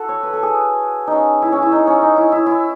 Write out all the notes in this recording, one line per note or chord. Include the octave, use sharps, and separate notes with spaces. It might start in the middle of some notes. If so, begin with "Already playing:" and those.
Already playing: F#4 A4
C#5
B4
A4
G#4
D#4
C#4
E4
C#4
E4
D#4
C#4
D#4
E4
E4
E4